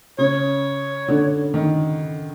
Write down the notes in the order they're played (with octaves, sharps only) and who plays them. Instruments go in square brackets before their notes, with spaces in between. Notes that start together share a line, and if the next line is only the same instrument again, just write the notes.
[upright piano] C#3 [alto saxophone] C#5
[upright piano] D3
D#3